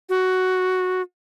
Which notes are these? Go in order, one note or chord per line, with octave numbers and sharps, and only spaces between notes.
F#4